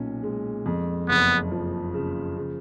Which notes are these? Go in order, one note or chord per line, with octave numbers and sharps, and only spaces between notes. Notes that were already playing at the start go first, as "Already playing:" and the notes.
Already playing: B1 A#2 C#4
G#3
F2
F#1 B3
F3
C#3
C#3